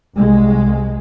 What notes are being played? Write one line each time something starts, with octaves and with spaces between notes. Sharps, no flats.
C2 G#3